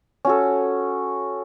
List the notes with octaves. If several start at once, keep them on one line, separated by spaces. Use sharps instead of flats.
C#4 F#4 A4